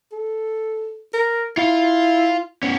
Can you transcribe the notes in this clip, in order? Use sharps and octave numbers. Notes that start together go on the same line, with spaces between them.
A4
A#4
E4 F4 F5
B3 C#4